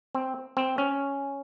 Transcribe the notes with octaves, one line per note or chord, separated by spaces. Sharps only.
C4
C4
C#4